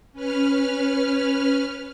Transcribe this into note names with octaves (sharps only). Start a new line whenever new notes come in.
C#4 B4 F6